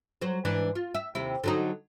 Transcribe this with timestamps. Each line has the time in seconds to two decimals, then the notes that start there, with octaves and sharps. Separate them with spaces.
0.22 F#3 C5
0.45 G#2 E3 D4
0.75 F4
0.94 E5
1.15 D#2 C3 E4
1.44 D3 F#3 D#4